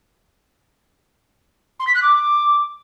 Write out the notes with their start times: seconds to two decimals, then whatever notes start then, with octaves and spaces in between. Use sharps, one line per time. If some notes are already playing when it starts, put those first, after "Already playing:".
1.80 C6
1.87 B6
1.95 F#6
2.02 D6